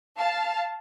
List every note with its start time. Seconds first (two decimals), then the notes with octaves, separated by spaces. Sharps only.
0.17 F5 A5